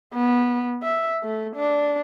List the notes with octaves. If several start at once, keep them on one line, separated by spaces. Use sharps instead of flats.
B3
E5
A3
D4